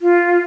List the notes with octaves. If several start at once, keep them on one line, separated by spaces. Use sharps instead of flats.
F4